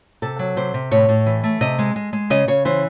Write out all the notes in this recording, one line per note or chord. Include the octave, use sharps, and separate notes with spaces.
C3 A4
F#3
C3 C5
C3
A2 C#5
A2
E3
A3
C3 D#5
G#3
G#3
G#3
C#3 D#5
C#3 C#5
E3 C5